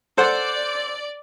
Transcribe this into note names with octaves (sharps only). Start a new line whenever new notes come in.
A4 C5 D5 F#5